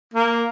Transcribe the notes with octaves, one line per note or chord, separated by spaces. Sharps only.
A#3